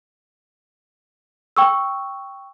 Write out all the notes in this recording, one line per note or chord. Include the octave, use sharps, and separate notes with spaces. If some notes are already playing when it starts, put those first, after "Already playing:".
G5 C#6 E6